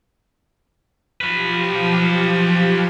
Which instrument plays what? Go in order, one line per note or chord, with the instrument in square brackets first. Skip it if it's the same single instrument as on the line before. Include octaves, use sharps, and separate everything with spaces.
[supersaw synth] F3 G4 [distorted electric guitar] F#3 B4